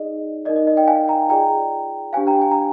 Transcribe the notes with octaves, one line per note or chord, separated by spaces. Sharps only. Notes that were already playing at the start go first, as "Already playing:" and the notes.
Already playing: D#4 G#4 D5 D#5
D#4 A#4 D5 D#5
D#5
D#5
D#5 G5
F5 G#5
G5 A#5
F4 G#4 D5 G5 A#5
D4 G4 C5 F5 G#5
G5 A#5
G#5
A#5